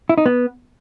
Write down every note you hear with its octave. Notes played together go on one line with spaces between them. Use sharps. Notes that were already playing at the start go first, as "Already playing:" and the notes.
E4
D#4
B3